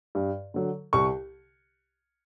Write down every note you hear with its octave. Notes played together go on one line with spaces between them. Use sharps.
G2
D3 F#3
C2 C#6